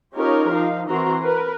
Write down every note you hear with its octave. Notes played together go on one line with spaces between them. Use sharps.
C#4 D#4 F4 G4 A#4 C#5
F3 D#4 F5
E3 C4 F#4 A#4 A#5 C6
A#4 B4